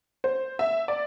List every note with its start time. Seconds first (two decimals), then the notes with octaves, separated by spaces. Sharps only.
0.24 C5
0.59 E5
0.88 D5